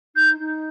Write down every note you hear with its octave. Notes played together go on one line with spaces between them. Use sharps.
D#4 G6
D#4